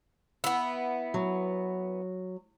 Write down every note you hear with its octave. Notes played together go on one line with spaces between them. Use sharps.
B3 E4
F#3